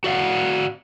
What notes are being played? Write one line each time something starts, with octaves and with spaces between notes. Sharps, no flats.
F#4 D5 F5 F#5